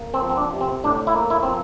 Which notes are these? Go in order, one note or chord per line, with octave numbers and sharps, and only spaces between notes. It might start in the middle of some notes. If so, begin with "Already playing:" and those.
Already playing: A#3
C4
F3
C4
D4
C3
C4
A2 D4
E4
A#3
E4
F3 C4